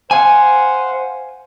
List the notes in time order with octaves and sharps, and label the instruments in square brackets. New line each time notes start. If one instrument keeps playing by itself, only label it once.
[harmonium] C5 F5 F#5 [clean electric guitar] G#5